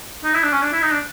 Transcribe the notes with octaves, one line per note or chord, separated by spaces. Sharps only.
D#4
E4
D4
C#4
D4
E4
D#4
D4